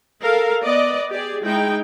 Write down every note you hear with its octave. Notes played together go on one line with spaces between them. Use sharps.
A4 A#4 F5
B3 D5 D#5
G4 G#4 D5
G#3 D#4 E4 G5